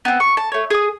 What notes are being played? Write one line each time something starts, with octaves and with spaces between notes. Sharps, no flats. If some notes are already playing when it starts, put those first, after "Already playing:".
B3 C4
C#6
A5
A3 C#5
G#4 D#6